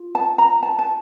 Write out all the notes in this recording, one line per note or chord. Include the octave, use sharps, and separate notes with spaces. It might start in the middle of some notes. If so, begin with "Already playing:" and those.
Already playing: F4
A5
A#5
A5
A5